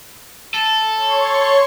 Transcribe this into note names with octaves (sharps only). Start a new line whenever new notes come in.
A4
C#5 C6 C#6